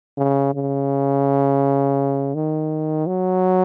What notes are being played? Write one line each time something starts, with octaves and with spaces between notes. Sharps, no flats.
C#3
C#3
D#3
F#3